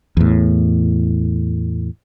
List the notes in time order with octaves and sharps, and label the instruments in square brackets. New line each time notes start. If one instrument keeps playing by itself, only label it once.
[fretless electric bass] E2 A2